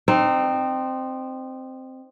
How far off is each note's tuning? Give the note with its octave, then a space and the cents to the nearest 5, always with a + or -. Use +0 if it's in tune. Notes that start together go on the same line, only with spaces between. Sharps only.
C4 +0 D#4 -25